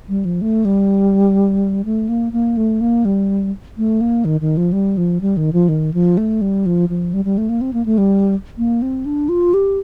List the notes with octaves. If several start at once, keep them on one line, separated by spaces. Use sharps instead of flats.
G3
F3
A3
G3
A3
A#3
A#3
A3
A#3
G3
A3
A#3
D#3
D#3
F3
G3
F3
G3
D#3
F3
D#3
F3
A3
G3
F3
F3
G3
G3
A3
A#3
C4
A#3
A3
G3
A#3
C4
D4
F4
G4